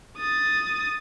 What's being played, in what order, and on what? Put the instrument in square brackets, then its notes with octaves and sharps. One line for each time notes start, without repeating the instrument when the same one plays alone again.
[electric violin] D#6 A6